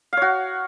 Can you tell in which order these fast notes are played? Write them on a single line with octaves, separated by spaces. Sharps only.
F5 C#5 F#4